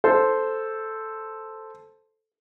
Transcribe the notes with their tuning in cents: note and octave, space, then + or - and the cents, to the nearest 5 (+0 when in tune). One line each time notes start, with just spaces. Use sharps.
A4 +0 C5 +0